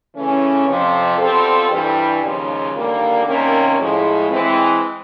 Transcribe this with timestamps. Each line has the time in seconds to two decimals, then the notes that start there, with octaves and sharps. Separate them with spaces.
0.15 C#3 E3 A3 C#4
0.67 F2 C3 F3
1.18 B2 G3 C4 F4 A4
1.70 G2 E3 G3
2.22 D#2 C#3 F3 G#3
2.74 D#2 D3 G3 A#3
3.25 C3 D#3 G3 A#3 C#4
3.78 A2 F3 G#3
4.29 E3 G#3 C4